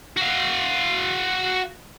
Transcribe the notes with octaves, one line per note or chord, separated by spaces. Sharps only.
F#4 F5